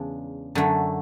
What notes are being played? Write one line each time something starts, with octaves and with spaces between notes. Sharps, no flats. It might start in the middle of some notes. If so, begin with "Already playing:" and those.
Already playing: E2 C#3 G#3 D4
F#2 D3 F#3 A3